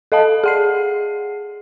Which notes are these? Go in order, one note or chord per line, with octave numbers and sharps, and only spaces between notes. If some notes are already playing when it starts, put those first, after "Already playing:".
A4 D#5 F5 A5
G#4 F#5 C7